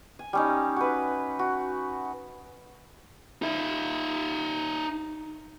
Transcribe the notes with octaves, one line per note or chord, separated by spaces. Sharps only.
G#5
G3 C#4 D#4
F#4 B4
F#4
D#4 E5